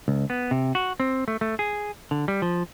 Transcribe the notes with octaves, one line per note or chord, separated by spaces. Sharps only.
C#2
B3
C3
F#4
C4
A3
A3
G#4
D3
G3
F3